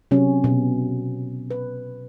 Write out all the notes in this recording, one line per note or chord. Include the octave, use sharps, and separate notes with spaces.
C3 F#3 C#4
B2
B4